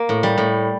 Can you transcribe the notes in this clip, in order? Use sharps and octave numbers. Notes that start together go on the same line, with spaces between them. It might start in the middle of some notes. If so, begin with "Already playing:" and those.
Already playing: A#3
A2
G3
A2